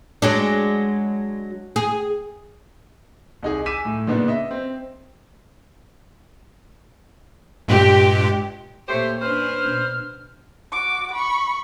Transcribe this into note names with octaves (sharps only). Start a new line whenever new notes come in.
F#3 G#3 D4
G#4
C2 D#4 G#4
G#5 D6 E6 B6 D#7 E7
A2
A#2 C#3 B3 D4 D#4
D#5 E5
C4
G2 A#2 G#3 G4
A#2 A3 G4 C5 C#5
C#4 D4 B4 C5 F6
B2
F#4 D6
B5 C#6